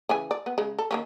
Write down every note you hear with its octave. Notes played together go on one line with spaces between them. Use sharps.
C#3 E3 G#5
D5
B3
C#3 G#3
A4
D#3 A#3 C#4